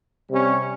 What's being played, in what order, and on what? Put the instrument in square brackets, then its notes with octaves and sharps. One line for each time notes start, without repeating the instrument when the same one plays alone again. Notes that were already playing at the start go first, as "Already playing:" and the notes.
[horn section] C3 G3 C#4